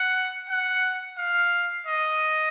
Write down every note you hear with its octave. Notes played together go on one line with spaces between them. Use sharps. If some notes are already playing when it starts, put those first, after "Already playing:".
Already playing: F#5
F#5
F5
D#5